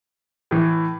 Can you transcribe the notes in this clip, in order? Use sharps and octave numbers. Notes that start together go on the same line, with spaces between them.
A2 E3